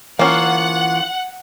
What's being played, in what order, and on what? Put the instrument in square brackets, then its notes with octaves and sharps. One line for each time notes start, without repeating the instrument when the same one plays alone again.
[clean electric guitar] E3 F4 [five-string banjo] A#3 C#4 [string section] F#5